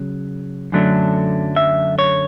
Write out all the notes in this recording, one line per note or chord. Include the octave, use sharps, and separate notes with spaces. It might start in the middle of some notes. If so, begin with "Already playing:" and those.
Already playing: C#3 F#3
F#2 D3 F#3 A3 D4
E5
C#5